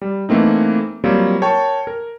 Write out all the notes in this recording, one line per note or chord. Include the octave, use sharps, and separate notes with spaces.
G3
E3 A3 A#3 C4 D#4
F#3 G3 A#3 C4 F4
A#4 C#5 G5 A5 C#6
A#4